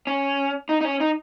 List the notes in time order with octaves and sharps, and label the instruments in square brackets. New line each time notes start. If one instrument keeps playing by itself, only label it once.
[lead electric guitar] C#4
D#4
D#4
C#4
D#4